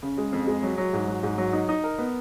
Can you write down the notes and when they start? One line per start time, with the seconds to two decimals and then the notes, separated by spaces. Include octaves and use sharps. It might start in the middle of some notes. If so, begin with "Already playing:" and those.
0.03 C#3
0.18 G#3
0.33 F2
0.47 G#3
0.63 F#3
0.78 F#3
0.93 G#2
1.08 F#3
1.23 G#2
1.38 F#3
1.53 D#4
1.69 D#4
1.84 A#4
1.98 B3